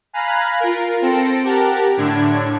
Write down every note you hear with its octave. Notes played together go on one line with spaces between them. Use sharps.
F5 G#5 A#5 B5 F#6
F4 A#4
C4 A4 A#6 D7
G4 A#4 F#5 A5
A2 D3 D4 G#6